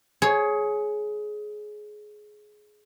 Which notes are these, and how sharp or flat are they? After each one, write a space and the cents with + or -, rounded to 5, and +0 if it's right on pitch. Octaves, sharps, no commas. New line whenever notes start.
G#4 +20 C#5 -5